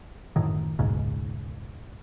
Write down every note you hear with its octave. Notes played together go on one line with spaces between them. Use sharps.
F#2 A2 D#3
D#1 B1 G#2 C#3